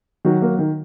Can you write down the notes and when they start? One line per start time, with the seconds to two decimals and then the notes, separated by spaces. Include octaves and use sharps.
0.25 D#3 F#3 F#4
0.42 A#3
0.59 D#3